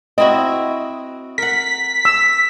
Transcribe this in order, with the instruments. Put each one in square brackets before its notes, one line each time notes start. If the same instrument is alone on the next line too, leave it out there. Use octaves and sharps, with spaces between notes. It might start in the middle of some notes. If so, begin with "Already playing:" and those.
[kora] C4 E4 F#4 [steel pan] D#5
[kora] A#4 F#5 [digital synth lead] B6
[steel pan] E6